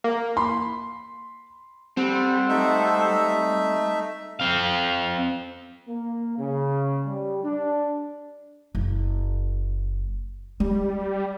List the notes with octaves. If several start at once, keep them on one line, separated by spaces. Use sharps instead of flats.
A#3
B5 C6
G3 C4 A4 C5 F#5
A3 D#4 E5
C4 F5
A#3
C#3
G3
D4
F#1
G3 G#3